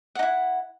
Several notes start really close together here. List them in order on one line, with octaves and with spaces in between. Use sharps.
F#5 D#4 E4